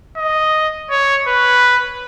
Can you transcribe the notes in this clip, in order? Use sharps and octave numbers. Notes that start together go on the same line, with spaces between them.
D#5
C#5
B4